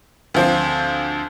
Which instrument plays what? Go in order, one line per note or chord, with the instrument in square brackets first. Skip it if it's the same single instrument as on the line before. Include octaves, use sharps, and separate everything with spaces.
[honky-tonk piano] D2 F3 C4